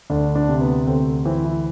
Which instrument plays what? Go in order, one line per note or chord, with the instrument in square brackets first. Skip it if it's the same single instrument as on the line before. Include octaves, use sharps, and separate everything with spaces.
[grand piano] D2 D4
D4
C3
B3
D2 C4
E3 C4
E4